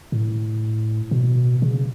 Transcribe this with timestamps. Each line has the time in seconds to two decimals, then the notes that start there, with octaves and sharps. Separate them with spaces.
0.12 A2
1.11 B2
1.62 C#3